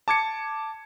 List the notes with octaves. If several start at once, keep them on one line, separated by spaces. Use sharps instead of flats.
A5 D6 G#6 C#7